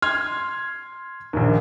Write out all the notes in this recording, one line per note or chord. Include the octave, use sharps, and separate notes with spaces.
C6 F6 G#6
A#1 D#2